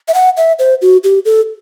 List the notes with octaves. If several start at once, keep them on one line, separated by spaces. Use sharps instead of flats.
E5
F#5
E5
C5
F#4
G4
A4